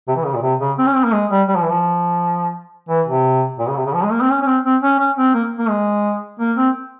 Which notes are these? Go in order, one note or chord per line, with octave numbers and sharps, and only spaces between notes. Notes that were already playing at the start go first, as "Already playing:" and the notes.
C3
E3
C#3
A#2
C3
C#3
C4
C#4
C4
A#3
G#3
G3
G3
F3
E3
F3
E3
C3
A#2
C#3
C3
C#3
F3
G#3
A#3
C4
C#4
C#4
C4
C4
C#4
C#4
C4
A#3
A#3
G#3
A#3
C4